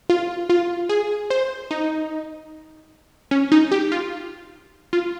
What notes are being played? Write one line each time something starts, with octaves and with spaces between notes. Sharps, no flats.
F4
F4
G#4
C5
D#4
C#4
D#4
G4
F4
F4